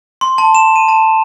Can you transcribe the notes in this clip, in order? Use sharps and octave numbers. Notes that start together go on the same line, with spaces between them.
C6
A5
E7
D#7
A5